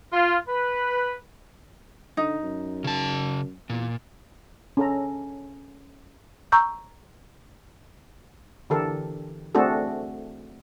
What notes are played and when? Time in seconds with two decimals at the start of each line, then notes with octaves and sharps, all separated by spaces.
0.13 F4
0.47 B4
2.17 D3 D#4
2.43 F#2
2.84 C#3 A5
3.70 E2 A#2
4.77 C#4 A4 A#5
6.52 A#5 C#6 E6 G6
8.70 D3 E3 G4 A4 A#4
9.55 A3 C4 D4 F#4 G#4 A4